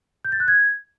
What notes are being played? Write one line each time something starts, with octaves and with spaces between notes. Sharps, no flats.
G6
A6
F#6
G#6